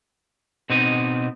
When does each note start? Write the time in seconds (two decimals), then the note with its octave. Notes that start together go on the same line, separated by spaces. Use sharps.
0.70 B2 C4 D#4 D#5